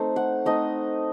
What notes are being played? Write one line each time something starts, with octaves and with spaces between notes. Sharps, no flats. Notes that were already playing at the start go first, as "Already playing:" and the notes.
Already playing: A3 C4 D#4 C5
F#5
A3 C4 D#4 D#5